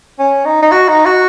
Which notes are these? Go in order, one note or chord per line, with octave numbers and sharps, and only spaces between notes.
C#4
D#4
D#4
F#4
D#4
F#4